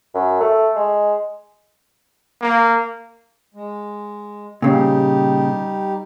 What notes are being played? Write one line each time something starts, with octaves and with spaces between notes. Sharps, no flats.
F#2
A3
G#3
A#3
G#3
A#2 C#3 G3 D#4 G4